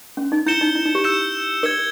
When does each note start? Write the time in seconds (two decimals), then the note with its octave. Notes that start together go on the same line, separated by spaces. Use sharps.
0.17 C#4
0.32 D#4
0.46 E4 G6 C#7 E7 G7
0.61 D#4
0.75 E4
0.85 D#4
0.95 G4
1.04 E6 G6 C#7 E7
1.63 A#4 E6 G#6 C#7 G7